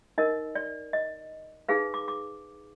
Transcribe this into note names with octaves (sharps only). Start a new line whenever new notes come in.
D#4 A#4 D#5
D5
D#5
D#4 G#4 B4 F5
D6
D6